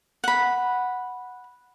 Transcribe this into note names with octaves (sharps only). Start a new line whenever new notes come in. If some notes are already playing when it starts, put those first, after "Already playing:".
F#5 B5